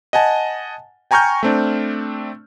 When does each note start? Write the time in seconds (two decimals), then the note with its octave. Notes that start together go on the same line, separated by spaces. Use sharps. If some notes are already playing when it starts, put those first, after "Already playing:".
0.13 D#5 F#5 G#5 A5
1.11 G5 G#5 A#5 C#6 F6 G6
1.43 A3 C4 D4